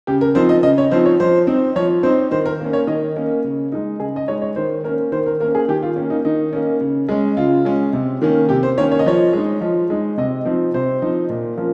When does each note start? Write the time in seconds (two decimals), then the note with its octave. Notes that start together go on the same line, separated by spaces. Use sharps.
0.07 C#3 G4
0.21 A#4
0.35 F3 C4 D#4 C5
0.49 D#5
0.63 C#3 D#5
0.78 C#5
0.91 F3 C4 D#4 C5
1.06 C#5
1.20 F3 C5
1.47 C4 D#4
1.76 F3 C#5
2.03 C4 D#4 C5
2.31 D#3 C5
2.46 A#4
2.60 A#3 C#4
2.73 C#5
2.87 D#3 D#5
3.16 A#3 C#4
3.44 C#3
3.72 G#3 D#4
4.00 C#3 G#4
4.16 D#5
4.28 G#3 D#4 C#5
4.42 C#5
4.56 D#3 C5
4.84 A#3 C#4 A#4
5.12 D#3 C5
5.26 A#4
5.40 A#3 A#4
5.45 C#4
5.55 G#4
5.68 D#3 G4
5.83 F4
5.96 A#3 C#4
6.10 D#4
6.25 D#3 D#4
6.53 A#3 C#4
6.81 C#3
7.09 G#3 C#4
7.37 C#3 F4
7.65 G#3 C#4
7.93 C3
8.22 D#3 A#3 C#4
8.49 C3 G4
8.63 C5
8.77 D#3 A#3 C#4 C#5
8.92 C#5
8.99 D#5
9.06 F3 C#5
9.33 G#3 D#4
9.61 F3
9.90 G#3 D#4
10.18 C3 D#5
10.45 F3 C4 D#4
10.74 C3 C5
11.02 F3 C4 D#4
11.30 A#2
11.57 F3 A#3 C#4